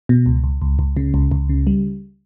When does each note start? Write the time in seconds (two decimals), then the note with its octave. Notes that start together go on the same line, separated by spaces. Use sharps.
0.09 B2
0.26 C#2
0.44 C#2
0.62 C#2
0.79 C#2
0.97 C#3
1.14 C#2
1.31 C#2
1.49 C#3
1.67 G3